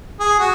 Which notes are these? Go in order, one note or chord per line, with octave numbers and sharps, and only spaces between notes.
G#4
F#4